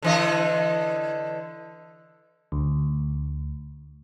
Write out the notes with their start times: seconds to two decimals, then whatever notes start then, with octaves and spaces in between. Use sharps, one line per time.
0.02 D3 E3 D#5
2.52 D2